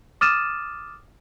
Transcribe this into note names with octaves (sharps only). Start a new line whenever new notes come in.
D6 D#6 F6 A6 D#7 E7